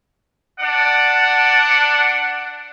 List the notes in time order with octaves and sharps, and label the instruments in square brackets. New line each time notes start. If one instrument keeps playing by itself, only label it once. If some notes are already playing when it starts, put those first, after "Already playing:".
[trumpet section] D4 D5 F#5